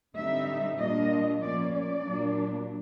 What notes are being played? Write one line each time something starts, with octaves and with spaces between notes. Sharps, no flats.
D3 G3 C4 D#4 E5
A#2 G3 A#3 D4 F4 D#5
F3 A#3 C#4 D5
D5
A#2 F#3 A#3 D4